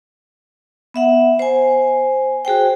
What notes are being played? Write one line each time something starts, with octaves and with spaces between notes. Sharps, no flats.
B3 E5 F#5
C5 G#5
F#4 G#4 C5 G5